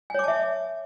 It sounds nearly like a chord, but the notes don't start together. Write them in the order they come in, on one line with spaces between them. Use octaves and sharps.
G#5 C#5 D6 A5 E5